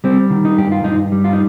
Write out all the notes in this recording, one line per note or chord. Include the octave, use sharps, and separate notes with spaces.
G3 C4
D#3
D#4
G2 G4
F4
G2 D#4
G3
F4
D#4